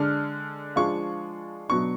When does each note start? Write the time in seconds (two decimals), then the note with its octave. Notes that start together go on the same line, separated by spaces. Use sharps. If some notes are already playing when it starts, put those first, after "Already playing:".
Already playing: D3 G#3 D4 F6
0.76 F3 G#3 D4 F4 C#6
1.69 B2 F#3 B3 D4 C#6